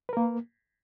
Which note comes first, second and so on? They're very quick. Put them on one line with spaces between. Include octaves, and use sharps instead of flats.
B4 A#4 A#3